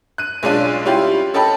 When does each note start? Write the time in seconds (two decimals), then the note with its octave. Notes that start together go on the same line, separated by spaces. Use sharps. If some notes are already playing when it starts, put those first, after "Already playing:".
0.18 F#6 D#7
0.43 B1 G#3 C#4 D4 F4 D#7
0.85 G3 C#4 E4 F4 G4
1.34 C#4 A4 D#5 G5 A5 B5